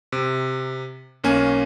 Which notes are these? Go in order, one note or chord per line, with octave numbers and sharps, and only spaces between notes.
C3
B1 A#3 C#4 G#5